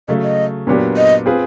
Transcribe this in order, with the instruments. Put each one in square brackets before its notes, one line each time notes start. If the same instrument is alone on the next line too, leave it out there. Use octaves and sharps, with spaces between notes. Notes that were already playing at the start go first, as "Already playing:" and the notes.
[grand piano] C#3 F#3 A3 [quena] D#5
[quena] D#5
[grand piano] A#2 F#3 B3 D4 G4
[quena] D#5
[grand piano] C4 F4 G#4 B4